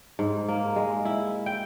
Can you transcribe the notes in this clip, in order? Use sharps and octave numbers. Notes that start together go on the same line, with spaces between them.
G#2
A#3
G#3
E4
G5